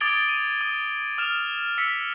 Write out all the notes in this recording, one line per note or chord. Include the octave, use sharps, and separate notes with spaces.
D6 D#6 G#6 A6 D7 G7
D#7
D#6
D#6 F6 E7 F7
E6 B6 C#7